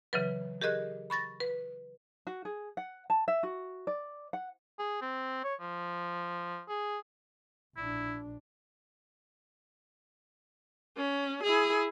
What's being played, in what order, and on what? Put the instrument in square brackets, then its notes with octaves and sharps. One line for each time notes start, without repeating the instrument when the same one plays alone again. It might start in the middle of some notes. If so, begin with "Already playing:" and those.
[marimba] C#3 E3 F#3 B4
G4 G#4 A#4 D#5 F#6
B5 C#6 A6 A#6
B4
[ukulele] F#4
G#4
F#5
A5
E5
F#4
D5
F#5
[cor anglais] G#4
C4
C#5
F3
G#4
[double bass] A#1 D4 [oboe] E4
[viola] C#4
E4 G#4